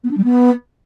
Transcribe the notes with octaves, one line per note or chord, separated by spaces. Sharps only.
B3
D4
G3
B3